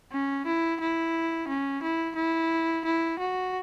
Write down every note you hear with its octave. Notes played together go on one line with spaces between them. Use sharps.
C#4
E4
E4
C#4
E4
E4
E4
F#4